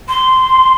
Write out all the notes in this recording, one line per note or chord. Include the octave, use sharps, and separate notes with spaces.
C6